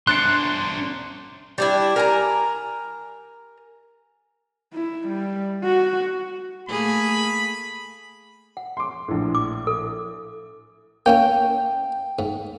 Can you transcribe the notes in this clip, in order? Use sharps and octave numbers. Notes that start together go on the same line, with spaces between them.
G1 D4 C5 C6 F#6 A6 C#7
G3 D4 E4
A#4 G#5 A#5
E4
G3
F#4
A3 A#3 G#4 B5
F#5
C6 D6
A#1 A2
D6
A4
A#3 C#4 E4 G5
G#2